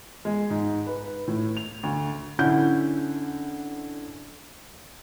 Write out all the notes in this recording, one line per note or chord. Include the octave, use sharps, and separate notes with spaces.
G#3
G#2
B4
A2
F7
D2
D3 C#4 E4 F#5 G6